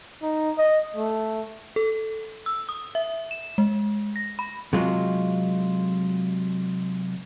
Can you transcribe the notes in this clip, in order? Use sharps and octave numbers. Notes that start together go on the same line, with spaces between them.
D#4
D#5
A3
A4
E6
D#6
E5
E7
G#3
A#6
B5
C3 F#3 G#3 F4